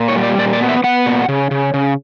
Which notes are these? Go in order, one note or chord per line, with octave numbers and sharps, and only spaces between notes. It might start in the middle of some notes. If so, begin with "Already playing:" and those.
Already playing: A#2
C#5
G3
D5
A#2 D5
D5
B3
E5
B3 F#5
A#2
C#3
C#3
C#3